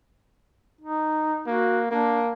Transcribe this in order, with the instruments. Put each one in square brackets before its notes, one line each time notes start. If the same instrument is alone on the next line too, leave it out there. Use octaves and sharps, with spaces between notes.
[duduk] D#4
[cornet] A#3 [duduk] F#4
[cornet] A#3 [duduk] D4